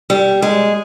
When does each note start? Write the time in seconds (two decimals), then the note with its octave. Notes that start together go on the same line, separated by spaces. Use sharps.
0.10 G3
0.42 G#3